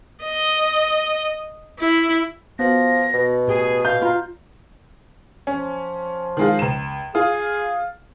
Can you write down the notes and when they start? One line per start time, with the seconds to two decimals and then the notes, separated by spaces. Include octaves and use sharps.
0.24 D#5
1.80 E4
2.59 F3 B3 F#4 A#6
3.14 B2
3.48 A2 G4 G#4
3.85 F5 G6
4.02 F4 A#5 B5
5.47 F3 C#4
6.37 D#3 G#3 F4
6.59 C#2 E7
7.15 F4 G#4